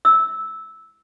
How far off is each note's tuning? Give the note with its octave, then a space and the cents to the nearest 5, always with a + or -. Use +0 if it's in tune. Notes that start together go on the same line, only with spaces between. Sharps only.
E6 -10